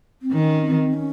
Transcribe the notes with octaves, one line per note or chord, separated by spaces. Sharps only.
C4
D#3 C#4
C4
C#4